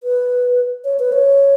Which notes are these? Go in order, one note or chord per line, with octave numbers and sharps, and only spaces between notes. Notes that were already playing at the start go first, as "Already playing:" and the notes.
B4
C#5
B4
C#5